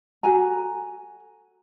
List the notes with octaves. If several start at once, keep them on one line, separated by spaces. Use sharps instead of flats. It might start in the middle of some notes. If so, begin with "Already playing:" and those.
F#4 A4 G#5 A#5